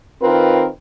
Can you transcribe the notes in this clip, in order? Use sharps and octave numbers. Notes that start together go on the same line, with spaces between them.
D#3 C4 F4 A#4 B4